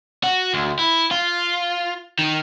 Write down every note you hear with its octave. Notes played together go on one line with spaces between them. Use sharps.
F#4
D2
E4
F4
D#3